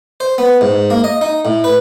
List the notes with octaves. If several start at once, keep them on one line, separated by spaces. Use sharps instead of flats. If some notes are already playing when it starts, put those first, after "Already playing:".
C5
B3
G#2
A#3
D#5
D#4
A2
B4